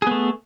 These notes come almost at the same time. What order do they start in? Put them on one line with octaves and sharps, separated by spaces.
G#4 B3 A3